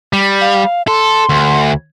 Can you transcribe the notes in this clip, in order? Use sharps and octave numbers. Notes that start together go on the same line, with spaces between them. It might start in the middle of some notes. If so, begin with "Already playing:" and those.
G3
F5
A4 C6
D2